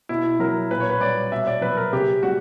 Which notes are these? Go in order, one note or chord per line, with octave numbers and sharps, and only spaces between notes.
B2 E4
F#3 A#4
A#2 B4
C#5
B4
G3 D5
B2 E5
D5
F#3 B4
A#4
C#3 G4
G3 F#4